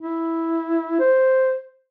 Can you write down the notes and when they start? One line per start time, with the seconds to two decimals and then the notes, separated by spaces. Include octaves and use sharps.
0.01 E4
1.00 C5